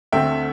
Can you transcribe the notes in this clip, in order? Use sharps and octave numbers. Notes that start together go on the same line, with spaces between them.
D2 D3 A3 C4 E5 G5